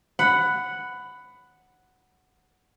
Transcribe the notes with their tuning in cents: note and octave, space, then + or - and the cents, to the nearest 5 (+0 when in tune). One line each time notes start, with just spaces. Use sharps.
F#5 +0 B5 +15